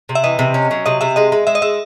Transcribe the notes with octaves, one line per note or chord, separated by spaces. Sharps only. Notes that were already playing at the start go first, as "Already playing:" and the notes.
C3
E5
E3 D#5
C3
C#4
F#3
C3 D#5
C3 E5
G#3 D#5
G#3
G#3 E5
D#5
G#3 E5